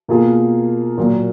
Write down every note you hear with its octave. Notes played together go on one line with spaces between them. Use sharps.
B2 A#3 F4 G#4
A#2 F#3 A#3